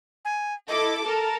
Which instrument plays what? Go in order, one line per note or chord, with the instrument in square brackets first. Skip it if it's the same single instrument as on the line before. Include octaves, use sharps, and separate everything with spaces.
[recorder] G#5
[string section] E4 A4 D6 [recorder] D#5
[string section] A4 A#4 [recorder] A5